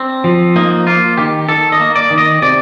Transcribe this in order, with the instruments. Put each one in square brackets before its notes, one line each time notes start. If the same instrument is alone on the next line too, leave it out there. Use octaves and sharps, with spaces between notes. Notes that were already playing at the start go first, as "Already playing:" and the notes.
Already playing: [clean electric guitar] C4 D4
F3
A#3 D#4
A#3 F4
D#3 G4
D#3 A4
D#5
A#3
D5
D#3
D#5
C3 D5